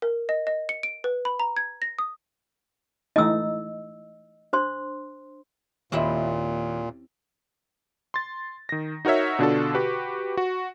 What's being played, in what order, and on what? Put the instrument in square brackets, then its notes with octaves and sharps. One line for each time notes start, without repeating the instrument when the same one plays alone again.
[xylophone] A#4
D#5
D#5
C#7
D7
B4
B5
A#5
G#6
A#6
D#6
[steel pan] E3 A3 D#4 [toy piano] D#5 E6
[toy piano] D4 C5 C6
[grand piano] D#2 D#5 E5 [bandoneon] A#2 [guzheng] C4 C#4 E4
[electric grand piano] C6 A6
D#3 A#6
D#4 F#4 A#4 C#5 E5
B2 D3 D4 F4 F#4 A4
F#4 G4 B4
F#4